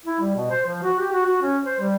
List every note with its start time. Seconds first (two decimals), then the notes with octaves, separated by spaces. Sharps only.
0.06 E4
0.20 G3
0.36 B2
0.51 C5
0.67 F3
0.83 F#4
1.00 G4
1.12 F#4
1.26 F#4
1.42 C#4
1.65 C5
1.80 G3